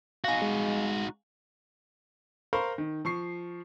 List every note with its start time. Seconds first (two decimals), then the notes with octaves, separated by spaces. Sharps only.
0.24 D#4 F#4 F5 F#5 G#5 A#6
0.42 G#3
2.53 A#4 C5 F5 A#5 B5 C#6
2.78 D#3
3.05 F3 C#6 C7